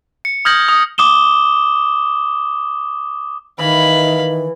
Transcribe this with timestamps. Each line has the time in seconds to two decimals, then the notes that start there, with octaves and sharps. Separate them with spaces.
0.25 C#7
0.45 D#6 F6 G6 G#6 A#6 F#7
0.69 D#6
0.98 D6 D#6 E7 G7
3.59 D#3 E3 F5 B5